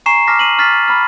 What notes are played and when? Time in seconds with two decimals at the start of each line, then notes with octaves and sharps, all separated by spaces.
0.06 G#5 A#5 C#6 C7 E7
0.27 A5 D6 F6 A#6 B6
0.39 D#7 F#7
0.58 C#6 F6 A6 B6
0.88 B5 F6